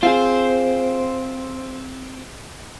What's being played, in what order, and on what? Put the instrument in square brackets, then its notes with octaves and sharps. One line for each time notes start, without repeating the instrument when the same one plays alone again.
[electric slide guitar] C4 [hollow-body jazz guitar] F4 G#4 [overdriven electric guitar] C5